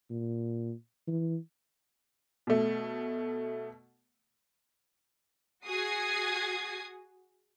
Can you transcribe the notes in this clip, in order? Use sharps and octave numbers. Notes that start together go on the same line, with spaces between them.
A#2
E3
B2 A3
F#4 G#4 D#6 G#6 C7